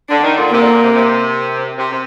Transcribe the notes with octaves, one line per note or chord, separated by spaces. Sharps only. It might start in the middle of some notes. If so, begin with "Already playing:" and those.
D3 D4
D#3
A#2 D3
C3 A#3
A#2 D3
A#2
C3
C3
C3
C3